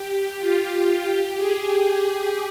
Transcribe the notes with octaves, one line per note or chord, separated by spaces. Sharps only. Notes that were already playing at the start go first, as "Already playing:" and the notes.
Already playing: G4
F4
G4
G#4